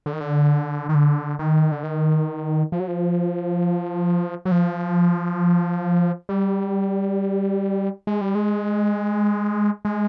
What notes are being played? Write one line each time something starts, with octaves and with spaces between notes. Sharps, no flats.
D3
D#3
D3
D#3
D3
D#3
D3
D#3
F3
F#3
F3
F#3
F3
G3
G#3
G3
G#3
G#3